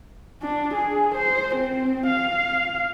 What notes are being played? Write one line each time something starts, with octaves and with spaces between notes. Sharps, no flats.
D4
G#4
C5
C4
F5